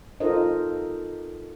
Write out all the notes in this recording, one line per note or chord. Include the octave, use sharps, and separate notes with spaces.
D#4 F4 A4 A#4 C5 D#5